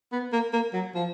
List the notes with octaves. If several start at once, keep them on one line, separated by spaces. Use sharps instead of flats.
B3
A#3
A#3
F#3
F3